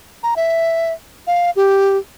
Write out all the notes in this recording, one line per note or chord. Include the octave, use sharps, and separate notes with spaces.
A#5
E5
F5
G4